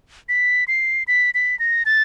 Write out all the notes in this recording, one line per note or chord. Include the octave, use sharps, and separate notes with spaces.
B6
C7
B6
B6
A#6
A6